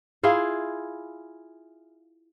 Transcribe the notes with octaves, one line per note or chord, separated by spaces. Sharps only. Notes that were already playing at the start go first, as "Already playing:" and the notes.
E4 F4 G#4